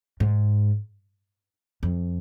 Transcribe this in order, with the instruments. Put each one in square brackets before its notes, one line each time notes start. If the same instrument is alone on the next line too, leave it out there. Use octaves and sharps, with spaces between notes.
[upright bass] G#2
F2